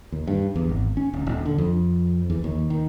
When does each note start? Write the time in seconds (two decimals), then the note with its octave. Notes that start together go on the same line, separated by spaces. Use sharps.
0.12 D#2
0.27 G2
0.56 E2
0.69 G#1
0.97 C#4
1.13 D1
1.27 D#1
1.46 D3
1.58 F2
2.30 E2
2.44 D#2
2.70 D#3